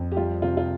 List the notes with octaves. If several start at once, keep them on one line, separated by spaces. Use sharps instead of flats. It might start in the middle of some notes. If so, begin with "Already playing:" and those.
Already playing: F2
G4
G3 F4
C3 F4
F4